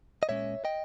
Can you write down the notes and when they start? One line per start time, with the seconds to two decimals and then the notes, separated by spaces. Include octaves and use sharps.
0.23 D#5
0.29 A#2 G#3 C#4 C#5 E5
0.65 D#5 G5